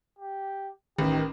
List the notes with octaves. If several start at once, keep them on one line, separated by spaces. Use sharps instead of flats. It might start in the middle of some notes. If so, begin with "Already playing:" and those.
G4
A1 D#3 G4